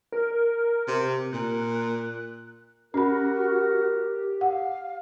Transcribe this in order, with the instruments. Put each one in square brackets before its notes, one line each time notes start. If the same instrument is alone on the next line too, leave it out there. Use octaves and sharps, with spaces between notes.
[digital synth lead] A#4
[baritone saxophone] C3
[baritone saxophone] A#2 [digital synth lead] F#6
[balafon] C#4 B5 [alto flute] F#4 [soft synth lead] G4 [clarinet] A#4
[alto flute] F5 [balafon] F#5